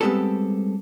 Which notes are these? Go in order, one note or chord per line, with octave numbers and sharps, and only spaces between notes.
G3 G#3 B3 C4 G4 A4